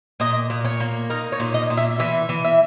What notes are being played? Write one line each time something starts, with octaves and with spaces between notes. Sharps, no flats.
A#2 D#5
A#2
C#5
A#3
D#4 A#4
C#5
A#2
D#5
A#2
E5
E3 E5
E3
E5